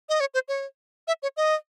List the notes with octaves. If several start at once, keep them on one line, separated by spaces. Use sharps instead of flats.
D#5
C#5
C5
C#5
E5
C#5
D#5